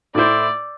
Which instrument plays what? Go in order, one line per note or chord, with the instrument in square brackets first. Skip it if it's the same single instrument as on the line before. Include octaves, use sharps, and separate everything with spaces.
[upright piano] A2 A3 E4 C5 [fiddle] D5